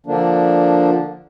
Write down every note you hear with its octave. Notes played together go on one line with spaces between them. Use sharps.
D3 F3 A#3 D4